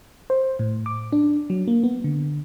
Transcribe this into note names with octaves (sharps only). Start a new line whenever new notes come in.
C5
A2
D6
D4
F#3
A#3
B3
D3